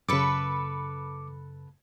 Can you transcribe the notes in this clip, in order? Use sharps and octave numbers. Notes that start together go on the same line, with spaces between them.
F#2 C#3 A4 B4 D6 C#7